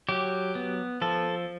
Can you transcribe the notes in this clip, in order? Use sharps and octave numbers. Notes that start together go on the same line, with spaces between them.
F#3 G4
B3
F3 A4